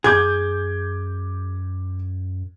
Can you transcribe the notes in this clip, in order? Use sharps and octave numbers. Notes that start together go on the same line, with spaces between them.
F#2 G#4 D6 G6 G#6